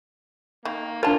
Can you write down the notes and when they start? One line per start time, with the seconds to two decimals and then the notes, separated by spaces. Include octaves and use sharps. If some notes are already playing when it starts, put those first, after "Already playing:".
0.65 D#3 A#3
1.03 D4 F4 A#4 C#5 A5